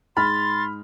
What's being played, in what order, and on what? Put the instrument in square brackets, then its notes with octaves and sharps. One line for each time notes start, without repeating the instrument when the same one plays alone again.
[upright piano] G#2 F6 [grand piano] B5 [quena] C6 [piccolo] A6